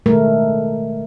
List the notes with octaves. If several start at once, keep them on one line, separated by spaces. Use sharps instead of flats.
B2 D#3 G#3 A3 A#4